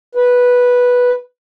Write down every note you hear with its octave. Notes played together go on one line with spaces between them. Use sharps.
B4